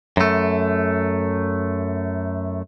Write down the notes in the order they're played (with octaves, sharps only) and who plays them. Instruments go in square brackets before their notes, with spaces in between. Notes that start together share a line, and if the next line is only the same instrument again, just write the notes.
[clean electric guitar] F#2 A3